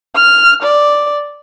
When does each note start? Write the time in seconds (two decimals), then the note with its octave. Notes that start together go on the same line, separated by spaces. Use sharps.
0.16 F6
0.63 D5